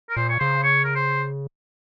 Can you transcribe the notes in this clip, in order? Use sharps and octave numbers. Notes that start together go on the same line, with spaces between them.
A#4
A#2 C5
C#5
C#3 C5
C#5
A#4
C5